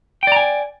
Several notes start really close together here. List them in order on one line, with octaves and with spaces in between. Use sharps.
G5 D5 A#5 G#5